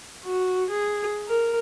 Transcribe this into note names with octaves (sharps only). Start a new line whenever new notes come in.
F#4
G#4
A#4